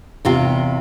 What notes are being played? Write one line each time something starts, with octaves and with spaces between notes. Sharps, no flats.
E2 C3 F4